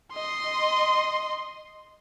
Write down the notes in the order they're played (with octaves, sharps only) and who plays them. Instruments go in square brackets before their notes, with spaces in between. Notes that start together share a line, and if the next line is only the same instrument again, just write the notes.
[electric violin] D#5 C6